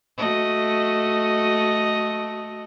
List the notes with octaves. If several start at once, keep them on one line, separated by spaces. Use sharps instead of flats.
A3 F#4 D#5